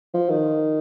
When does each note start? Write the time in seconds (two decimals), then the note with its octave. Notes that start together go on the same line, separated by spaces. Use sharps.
0.14 F3
0.29 D#3